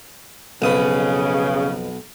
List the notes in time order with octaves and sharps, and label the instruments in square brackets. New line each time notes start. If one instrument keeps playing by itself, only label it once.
[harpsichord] B1 D#6 [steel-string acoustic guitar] F2 B4 [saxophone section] C#3